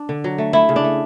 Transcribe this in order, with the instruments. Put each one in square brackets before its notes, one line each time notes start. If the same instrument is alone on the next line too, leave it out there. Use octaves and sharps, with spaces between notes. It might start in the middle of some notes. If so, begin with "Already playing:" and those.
Already playing: [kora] D4
D3
F#3
A3
A3 E4
C#3
D4
A3